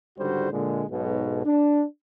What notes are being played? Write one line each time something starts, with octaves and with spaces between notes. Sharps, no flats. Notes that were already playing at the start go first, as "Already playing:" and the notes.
C#2 G#2 D3 G3 F#4 C5
A#2 D3 G#3
B1 G#2 B2
D4